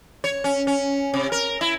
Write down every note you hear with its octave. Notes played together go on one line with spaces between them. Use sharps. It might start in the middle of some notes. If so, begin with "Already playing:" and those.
C#5
C#4
C#4
C3
A#4
E4